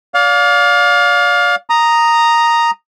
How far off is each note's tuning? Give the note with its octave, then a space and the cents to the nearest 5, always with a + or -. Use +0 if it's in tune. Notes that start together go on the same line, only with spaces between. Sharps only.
D5 -30 F5 +25
A#5 +0 D#6 -5